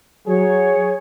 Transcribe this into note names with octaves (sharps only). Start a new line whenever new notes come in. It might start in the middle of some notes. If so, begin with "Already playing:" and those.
F#3 G#4 C#5